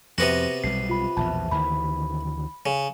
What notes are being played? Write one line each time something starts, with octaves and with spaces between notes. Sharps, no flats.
F2 C3 B3 F#4 A#6
B1 G3 C7
F4 B5
A#1 E2 B2 E5 A5
D2 D#3 E3 B5
C#3